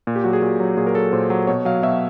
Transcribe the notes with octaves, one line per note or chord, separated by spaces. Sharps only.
A#2
G4
F#3 F#4
G#4
A#2
F#3
A#2 G#4
A#4
F#3 A4
A#2 C5
F#3
B2 C#5
F#3 F5
B2 E5